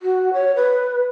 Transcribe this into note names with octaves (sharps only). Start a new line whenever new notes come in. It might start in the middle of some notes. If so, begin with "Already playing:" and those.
F#4
C#5
B4